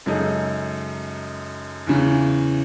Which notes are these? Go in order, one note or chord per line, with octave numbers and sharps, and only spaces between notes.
F#2 C#3 G#3 D#4 A4
E2 C#3 E3